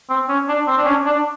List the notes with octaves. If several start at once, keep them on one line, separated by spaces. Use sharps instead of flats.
C4
C#4
D4
C4
D4
C#4
D4